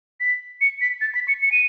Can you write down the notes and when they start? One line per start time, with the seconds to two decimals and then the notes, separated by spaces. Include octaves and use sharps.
0.20 B6
0.61 C#7
0.81 B6
1.01 A6
1.15 B6
1.28 C#7
1.42 C#7
1.52 D#7